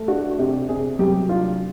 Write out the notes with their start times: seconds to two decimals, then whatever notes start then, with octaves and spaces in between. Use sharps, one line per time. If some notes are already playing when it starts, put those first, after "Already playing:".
Already playing: A3
0.08 D4 F#4
0.38 C3 G4
0.69 C3 G#4
0.99 F#3 G4
1.29 D4 F4